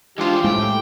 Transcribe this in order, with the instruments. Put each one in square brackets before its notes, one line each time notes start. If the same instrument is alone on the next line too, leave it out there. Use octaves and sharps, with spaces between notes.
[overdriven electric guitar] E3 C5 [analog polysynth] G#3 D4 F4 [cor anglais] G4
[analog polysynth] A2 A3 [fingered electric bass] G#3 [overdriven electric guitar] G5